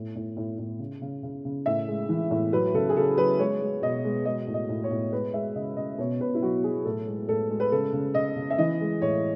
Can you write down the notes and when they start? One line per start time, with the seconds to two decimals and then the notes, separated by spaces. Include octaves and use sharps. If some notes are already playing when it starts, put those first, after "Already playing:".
Already playing: A2
0.16 A2
0.37 A2
0.58 A2
0.79 C#3
1.02 C#3
1.23 C#3
1.45 C#3
1.66 A2 E5
1.88 G#3
2.09 E3
2.31 A2
2.53 F#3 B4
2.74 C#3 A4
2.89 G#4
2.96 C#3 A4
3.17 F#3 B4
3.39 G#3 C#5
3.61 G#3
3.82 B2 D#5
4.04 G#3
4.25 G#3 D#5
4.47 A2
4.54 D#5
4.69 A2
4.84 C#5
4.91 A2
5.12 G#3 B4
5.34 G#3 E5
5.55 C#3 D#5
5.77 C#3 D#5
5.98 B2 C#5
6.20 B2 B4
6.35 E4
6.42 F#3 F#4
6.64 F#3 G#4
6.85 A2 A4
7.07 G#3
7.28 A2 A4
7.50 G#3
7.60 B4
7.72 C#3 A4
7.93 C#3
8.14 C#3 D#5
8.36 C#3
8.50 E5
8.58 E3 D#5
8.81 G#3
9.02 A2 C#5